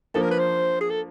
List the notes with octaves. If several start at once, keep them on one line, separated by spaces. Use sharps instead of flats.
F3 A#3 D4 A4
A#4
B4
C5
G#4
A4